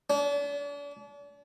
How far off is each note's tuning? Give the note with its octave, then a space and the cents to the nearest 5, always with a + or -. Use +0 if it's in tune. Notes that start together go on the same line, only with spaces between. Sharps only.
D4 -40